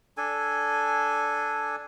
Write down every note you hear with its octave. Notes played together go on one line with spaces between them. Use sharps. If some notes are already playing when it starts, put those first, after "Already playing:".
D4 A4 G#5